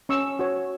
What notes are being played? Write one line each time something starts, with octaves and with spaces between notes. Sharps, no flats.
C#4 C#6 E6
F#4 C#5